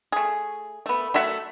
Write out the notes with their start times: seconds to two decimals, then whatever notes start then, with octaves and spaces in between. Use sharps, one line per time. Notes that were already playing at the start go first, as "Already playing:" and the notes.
0.12 A3 G#4
0.86 A3 B3
1.14 F#3 A3 E5 F#5